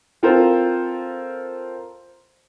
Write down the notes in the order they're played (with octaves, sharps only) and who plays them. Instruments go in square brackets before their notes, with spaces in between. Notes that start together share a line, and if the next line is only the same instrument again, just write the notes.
[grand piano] C4 F4 A4 A#4 C5